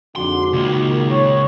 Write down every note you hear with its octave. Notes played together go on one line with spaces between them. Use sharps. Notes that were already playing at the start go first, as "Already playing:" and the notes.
F2 G#2 D3 F#4 C6 D6
C#2 A#2 D#3
C#5 C#6